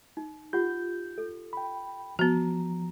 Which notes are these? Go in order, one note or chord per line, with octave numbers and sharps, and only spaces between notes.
D#4
F4 G4 F#5 G6
A4
G5 B5
F3 B3 F#4 A#5